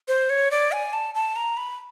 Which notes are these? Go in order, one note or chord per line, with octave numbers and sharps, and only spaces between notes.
C5
C#5
D5
G#5
A5
A5
A#5
B5